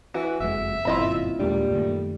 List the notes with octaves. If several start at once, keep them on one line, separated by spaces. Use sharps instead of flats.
E3 F#4
F#1 F2 G#3 E5
G1 F#2 A#2 C4 E4 F4 D#5 B5
D#2 A#2 G3 G#3 A#3 D4
F#2 D#3 A3